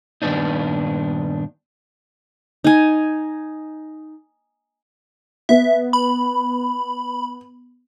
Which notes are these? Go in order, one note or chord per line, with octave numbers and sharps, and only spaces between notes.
G2 A#2 D#3 B3 D4 D#4
D#4 G#5
B3 E5
B5